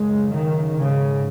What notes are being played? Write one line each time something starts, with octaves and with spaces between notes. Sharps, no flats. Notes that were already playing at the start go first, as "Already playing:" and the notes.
Already playing: F#2 C#3 G#3
D#3
G#2 C#3